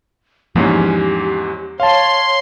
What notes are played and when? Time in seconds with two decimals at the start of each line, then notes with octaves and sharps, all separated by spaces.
0.56 E2 G#2 F3 A#3 C#4 G4
1.80 C#5 F5 A5 C6